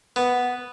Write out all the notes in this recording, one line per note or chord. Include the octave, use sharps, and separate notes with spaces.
B3